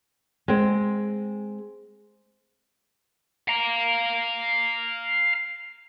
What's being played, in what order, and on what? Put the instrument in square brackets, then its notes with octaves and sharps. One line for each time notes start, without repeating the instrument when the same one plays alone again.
[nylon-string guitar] G#3 C4
[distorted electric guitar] F5 A#5